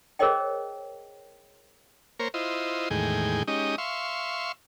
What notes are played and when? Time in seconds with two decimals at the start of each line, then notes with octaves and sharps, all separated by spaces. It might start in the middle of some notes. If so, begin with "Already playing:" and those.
0.19 G#4 A#4 C5 C#5 D#5 G5
2.19 A#3 A#4 C5 C#5
2.34 E4 F4 C5 D#5
2.90 E2 A2 D#3 G#3 G#4 G5
3.48 G#3 C#4 D#4 G4 D#5
3.78 E5 F5 C6 C#6